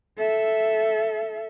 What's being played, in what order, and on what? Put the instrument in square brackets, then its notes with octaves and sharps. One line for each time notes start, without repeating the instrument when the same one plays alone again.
[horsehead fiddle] A4 E5